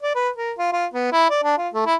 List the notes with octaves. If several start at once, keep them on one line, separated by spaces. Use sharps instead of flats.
D5
B4
A#4
F4
F4
B3
E4
D5
D4
F4
A3
E4